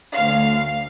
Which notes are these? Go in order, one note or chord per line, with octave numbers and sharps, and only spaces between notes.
D2 F5